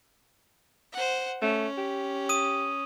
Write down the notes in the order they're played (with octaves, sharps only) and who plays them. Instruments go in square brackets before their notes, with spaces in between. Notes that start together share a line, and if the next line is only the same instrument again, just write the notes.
[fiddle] C5 F#5
[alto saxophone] A3 [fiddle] C#4
[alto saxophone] G4
[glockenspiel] D#6 D#7